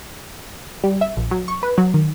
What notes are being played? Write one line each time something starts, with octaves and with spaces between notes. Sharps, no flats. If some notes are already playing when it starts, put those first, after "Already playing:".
G3
E5
A#1
F#3
C#6
B4
F#3
D#3